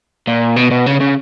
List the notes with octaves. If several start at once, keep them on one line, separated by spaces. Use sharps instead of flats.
A#2
B2
B2
C#3
C#3